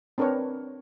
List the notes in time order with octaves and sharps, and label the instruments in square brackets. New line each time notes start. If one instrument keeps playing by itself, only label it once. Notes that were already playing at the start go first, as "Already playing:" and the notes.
[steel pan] C4 D4 A#4 B4 C#5